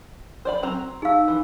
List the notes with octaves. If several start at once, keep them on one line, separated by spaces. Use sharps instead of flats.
C5 D5 B5
F#3 C4 A#5
D#4 G#4 F5 E6
E3